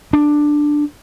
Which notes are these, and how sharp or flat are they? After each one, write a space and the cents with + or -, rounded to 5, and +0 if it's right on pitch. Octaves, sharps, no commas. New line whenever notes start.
D4 +5